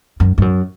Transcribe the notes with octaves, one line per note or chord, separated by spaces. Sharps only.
F#2
G2
F#2